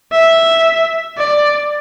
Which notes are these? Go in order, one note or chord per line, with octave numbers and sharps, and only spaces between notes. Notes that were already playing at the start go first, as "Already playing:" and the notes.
E5
D5